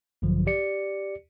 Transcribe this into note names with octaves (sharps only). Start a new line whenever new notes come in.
A#1 G2 D3 F3 F#3
G4 D5 C#7